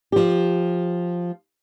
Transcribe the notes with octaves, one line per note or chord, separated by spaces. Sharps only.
F3 G4